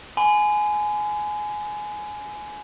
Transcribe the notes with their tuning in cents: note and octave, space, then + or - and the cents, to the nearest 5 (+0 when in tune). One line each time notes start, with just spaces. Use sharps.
G#5 +15 B5 +45